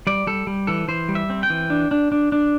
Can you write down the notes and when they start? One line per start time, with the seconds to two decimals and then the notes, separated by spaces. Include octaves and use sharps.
0.07 G3 D5
0.27 G3 A4
0.47 G3
0.67 E3 A4
0.88 E3 C5
1.09 G3
1.15 E5
1.30 C4
1.43 G5
1.50 E3
1.70 D4
1.91 D4
2.12 D4
2.32 D4